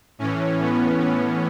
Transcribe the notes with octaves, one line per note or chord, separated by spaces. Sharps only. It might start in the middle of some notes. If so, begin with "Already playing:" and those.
A2 E3 C#4
B3
C#4